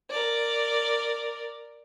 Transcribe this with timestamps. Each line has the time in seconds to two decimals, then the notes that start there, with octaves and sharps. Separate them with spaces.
0.10 A#4 D5